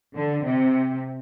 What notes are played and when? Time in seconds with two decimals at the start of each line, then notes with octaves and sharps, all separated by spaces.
0.15 D3
0.44 C3